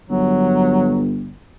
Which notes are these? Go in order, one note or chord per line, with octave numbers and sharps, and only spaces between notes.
G1 F#3